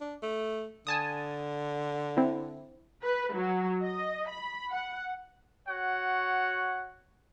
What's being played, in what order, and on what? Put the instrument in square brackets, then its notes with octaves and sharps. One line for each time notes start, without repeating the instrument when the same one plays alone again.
[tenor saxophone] D4
A3
[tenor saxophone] D3 [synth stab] G#5 A5 D#6
[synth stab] C4 E4
[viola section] B4
F#3
D#5
B5
F#5
[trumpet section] F#4 C#5 F#5